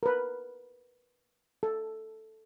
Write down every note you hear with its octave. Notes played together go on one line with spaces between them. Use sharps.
A#4 B4
A4